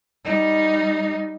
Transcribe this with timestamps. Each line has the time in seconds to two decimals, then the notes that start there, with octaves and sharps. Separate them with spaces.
0.25 G3 D#4